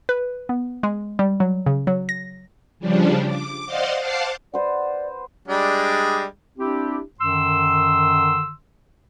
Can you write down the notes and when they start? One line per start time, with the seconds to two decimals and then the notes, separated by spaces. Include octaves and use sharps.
0.09 B4
0.49 B3
0.83 G#3
1.19 G3
1.40 F#3
1.66 C#3
1.87 F#3
2.09 A#6
2.79 C#3 F3 G3 D4
3.26 D6
3.66 C5 D5 D#5 F5 F#5 C6
4.00 C5 F5 F#5 A5 C6 D6
4.54 B4 C5 D5 F#5
5.48 G3 G#3 D4
6.58 C4 D4 E4 G4
7.20 F#2 D3 D#3 C6 E6